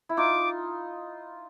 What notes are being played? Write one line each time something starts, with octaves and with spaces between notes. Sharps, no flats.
E4
D#4 F4 D6